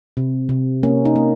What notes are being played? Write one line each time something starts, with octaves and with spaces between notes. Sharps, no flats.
C3
C3
A#3 C#4
D#4
A#3